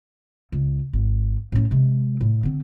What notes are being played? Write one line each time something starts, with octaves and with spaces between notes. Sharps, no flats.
C#2
G#1
A2 C#4
C3 G#3
A2
D3 C4